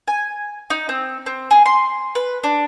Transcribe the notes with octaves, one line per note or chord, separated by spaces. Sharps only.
G#5
D#4
C4
C4
G#4
C6
B4
D4